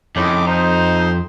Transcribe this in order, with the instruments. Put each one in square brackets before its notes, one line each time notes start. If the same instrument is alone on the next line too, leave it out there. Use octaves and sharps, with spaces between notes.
[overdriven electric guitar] F2 [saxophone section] A2 C#3 D#4 [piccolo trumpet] D6
[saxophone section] D#4 [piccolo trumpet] C5